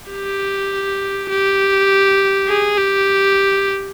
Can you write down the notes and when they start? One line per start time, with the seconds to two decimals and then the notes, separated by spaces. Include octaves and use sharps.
0.11 G4
1.30 G4
2.48 G#4
2.78 G4